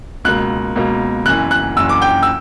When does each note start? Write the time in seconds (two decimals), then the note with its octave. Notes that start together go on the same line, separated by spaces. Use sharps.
0.25 C#2 B2 A#3 F#6
0.76 C#2 B2 A#3
1.26 F#1 F#2 E3 F#6
1.51 F#6
1.77 F#1 F#2 E3 E6
1.89 D6
2.02 G5
2.23 E6